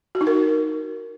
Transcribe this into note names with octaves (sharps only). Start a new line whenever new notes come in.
F#4
D#4
A#4